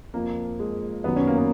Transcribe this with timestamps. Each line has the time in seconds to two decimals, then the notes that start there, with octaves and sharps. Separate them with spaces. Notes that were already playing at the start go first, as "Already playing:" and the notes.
0.14 F2 F3 A#3
0.59 G#3
1.04 F#2 D#3 F#3 B3
1.16 C#4
1.27 A#3
1.38 B3